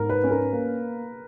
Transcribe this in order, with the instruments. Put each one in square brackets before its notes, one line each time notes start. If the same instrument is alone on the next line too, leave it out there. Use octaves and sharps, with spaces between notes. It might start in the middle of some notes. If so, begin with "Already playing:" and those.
Already playing: [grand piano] G#2 [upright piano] A#4
[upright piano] B4
[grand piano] C#4
[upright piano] A#4
[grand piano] A#3